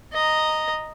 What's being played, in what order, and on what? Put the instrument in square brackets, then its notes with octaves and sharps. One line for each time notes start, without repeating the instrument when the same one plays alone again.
[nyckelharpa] D#5 A#5